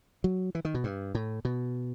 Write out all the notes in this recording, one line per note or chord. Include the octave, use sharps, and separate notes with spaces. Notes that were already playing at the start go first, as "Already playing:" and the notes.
F#3
E3
D#3
B2
G2
A2
B2